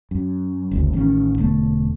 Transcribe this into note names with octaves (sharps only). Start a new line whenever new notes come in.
F#2
F#1 D2
A1 D#3 C#4
E1 D3 A3